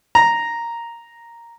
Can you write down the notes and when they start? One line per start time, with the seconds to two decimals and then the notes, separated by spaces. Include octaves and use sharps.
0.15 A#5